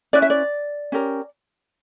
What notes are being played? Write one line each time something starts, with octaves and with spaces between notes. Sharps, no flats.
C#4 E4 B4 D5
E5
D5
C#4 G4 A#4